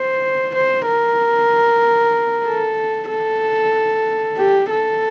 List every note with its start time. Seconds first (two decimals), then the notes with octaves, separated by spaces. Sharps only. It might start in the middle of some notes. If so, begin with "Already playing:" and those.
Already playing: C5
0.54 C5
0.86 A#4
2.46 A4
3.10 A4
4.38 G4
4.70 A4